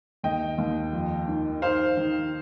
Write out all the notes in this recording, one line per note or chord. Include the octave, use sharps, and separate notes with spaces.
D#2 D#5 G5
D#2
F2
D#3
D#4 C5 F5
D#3